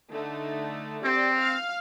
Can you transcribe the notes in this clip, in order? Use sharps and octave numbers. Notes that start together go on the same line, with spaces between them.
D3 A3 D#4
C4 G4 D5 G5
F5 F6